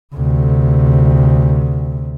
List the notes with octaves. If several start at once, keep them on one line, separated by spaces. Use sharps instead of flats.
D2 C3